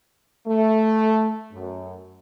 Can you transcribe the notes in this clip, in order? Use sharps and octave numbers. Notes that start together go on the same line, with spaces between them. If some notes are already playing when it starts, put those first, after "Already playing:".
A3
F#2